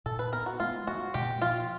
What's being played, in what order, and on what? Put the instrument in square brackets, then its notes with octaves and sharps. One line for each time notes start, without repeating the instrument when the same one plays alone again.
[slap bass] A#2 [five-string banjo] A4
[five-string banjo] B4
[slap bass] B3 [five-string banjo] A#4
[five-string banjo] F#4
[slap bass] G#3 [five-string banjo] F4
[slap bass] G#3 [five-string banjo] F#4
[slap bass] A#2 [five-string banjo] G4
[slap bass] F3 [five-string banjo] F4